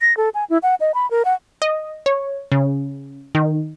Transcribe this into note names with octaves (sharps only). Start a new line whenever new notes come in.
A#6
A4
G#5
E4
F#5
D#5
B5
A#4
F#5
D#5
C#5
C#3
D#3